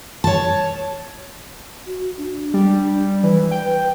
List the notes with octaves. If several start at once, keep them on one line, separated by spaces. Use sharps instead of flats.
C#5 A5
F#4
D4
G3
E3 B4
G5